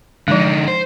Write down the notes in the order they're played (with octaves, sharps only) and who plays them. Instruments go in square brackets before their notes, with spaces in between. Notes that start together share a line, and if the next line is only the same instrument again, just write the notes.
[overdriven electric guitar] D3 D#4 [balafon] F3 G#3
[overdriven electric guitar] C5